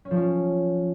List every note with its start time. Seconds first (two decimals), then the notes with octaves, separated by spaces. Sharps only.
0.05 C#4
0.11 F3
0.17 C#4